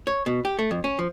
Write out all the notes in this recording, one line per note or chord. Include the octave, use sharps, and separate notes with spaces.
C#5
B2
G4
A3
F2
C#4
F3